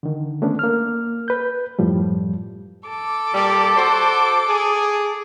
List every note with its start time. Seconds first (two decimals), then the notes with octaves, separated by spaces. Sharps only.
0.03 D3 D#3
0.42 A3 B3 C#4 D4
0.59 A#3 F6
1.28 B4 G6
1.79 F#2 A2 F3 G3
2.89 A4 D6
3.33 A#2 G3
3.75 F#4 C5
4.49 G#4